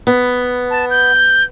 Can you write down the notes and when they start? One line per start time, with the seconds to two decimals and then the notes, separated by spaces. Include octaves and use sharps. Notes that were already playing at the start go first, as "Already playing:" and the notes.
0.07 B3
0.71 A5
0.90 G6